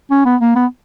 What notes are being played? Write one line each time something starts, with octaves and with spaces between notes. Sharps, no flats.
C#4
B3
A#3
B3